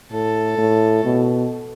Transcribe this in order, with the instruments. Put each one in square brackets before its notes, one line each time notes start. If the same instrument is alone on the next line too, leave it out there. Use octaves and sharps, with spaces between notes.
[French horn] A2 [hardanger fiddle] A4
[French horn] A2
B2